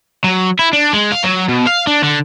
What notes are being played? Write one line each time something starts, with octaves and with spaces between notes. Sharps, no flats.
F#3
E4
D4
G#3
F5
F#3
B2
F5
D4
D3